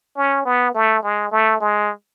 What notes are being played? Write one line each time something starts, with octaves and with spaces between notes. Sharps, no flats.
C#4
B3
A3
G#3
A3
G#3